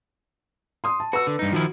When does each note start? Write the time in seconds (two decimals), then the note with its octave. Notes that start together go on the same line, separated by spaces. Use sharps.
0.84 C6 D#6 D#7
1.00 A5
1.13 F#4 B4 E6
1.27 D3
1.39 G2 D#4
1.53 D#3 F3 E4 F#4